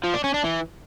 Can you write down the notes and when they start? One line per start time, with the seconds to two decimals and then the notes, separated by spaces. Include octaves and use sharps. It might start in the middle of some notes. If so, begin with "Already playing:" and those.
0.04 F3
0.14 D4
0.24 C#4
0.34 D4
0.44 E3